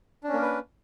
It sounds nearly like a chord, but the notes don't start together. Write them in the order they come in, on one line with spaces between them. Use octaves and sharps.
D4 C#4 A#3 A#4 B4